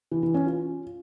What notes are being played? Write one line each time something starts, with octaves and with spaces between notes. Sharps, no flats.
E3
E3
C#4
F4